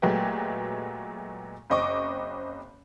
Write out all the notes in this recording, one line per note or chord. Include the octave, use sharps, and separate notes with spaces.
A#2 F#3 G#3 A3 B3 G4
F#1 C4 D#5 C#6 D6